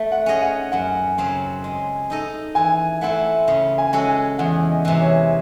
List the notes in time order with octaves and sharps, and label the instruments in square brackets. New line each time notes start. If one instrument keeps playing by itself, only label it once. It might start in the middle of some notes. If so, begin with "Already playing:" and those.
Already playing: [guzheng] A3
[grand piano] F#5
[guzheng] C#4 G#4 D#5
[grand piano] F#5
[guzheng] F#2 [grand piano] F#5
[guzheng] C#3 F#3 C4
G#3
D#4 A4 D#5
[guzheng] E3 [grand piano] G#5
[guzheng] A3 C4 E4 A4 [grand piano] F#5
[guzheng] C#3 [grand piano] E5
[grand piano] G#5
[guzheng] G#3 C#4 F#4 A4
[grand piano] G#5
[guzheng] E2 [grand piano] F#5
[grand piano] D#5
[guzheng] C3 E3
[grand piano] C#5